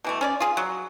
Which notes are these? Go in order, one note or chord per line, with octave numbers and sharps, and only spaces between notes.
B2 E3 A3
C#4 C#5 D5
F4 G#4
F#3